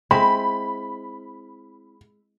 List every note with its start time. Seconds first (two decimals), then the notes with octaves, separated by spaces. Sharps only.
0.11 G#3 C4 E4 B5